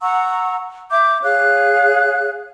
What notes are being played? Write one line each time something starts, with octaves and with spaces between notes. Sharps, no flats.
F#5 A#5 C#6 E6
E5 D6 G6
G#4 C#5 F5 F#6